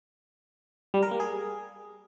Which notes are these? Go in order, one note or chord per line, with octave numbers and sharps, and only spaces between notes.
G3
A#4
A#3
G#4